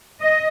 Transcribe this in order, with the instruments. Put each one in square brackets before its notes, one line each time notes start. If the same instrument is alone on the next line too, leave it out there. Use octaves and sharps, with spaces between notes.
[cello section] D#5